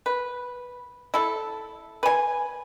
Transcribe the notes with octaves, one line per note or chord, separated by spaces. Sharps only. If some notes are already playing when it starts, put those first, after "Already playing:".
B4
E4 A4
B4 G#5